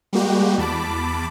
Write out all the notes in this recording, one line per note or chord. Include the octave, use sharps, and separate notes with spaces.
G3 G#3 A#3 F#4 G4
E2 A5 B5 D6